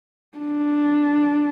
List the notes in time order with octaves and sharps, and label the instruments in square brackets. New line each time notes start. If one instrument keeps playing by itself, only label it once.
[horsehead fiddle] D4